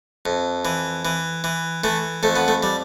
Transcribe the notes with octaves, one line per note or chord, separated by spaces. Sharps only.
F2
E3
E3
E3
E3 A3
F2 A3
B3
A3
G3